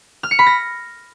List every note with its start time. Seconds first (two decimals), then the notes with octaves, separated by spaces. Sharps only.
0.23 F6
0.31 C#7
0.39 B5
0.47 A#6